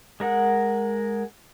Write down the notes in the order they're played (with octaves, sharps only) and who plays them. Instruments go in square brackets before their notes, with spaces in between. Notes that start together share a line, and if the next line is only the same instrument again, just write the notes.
[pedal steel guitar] G#3 A#4 F#5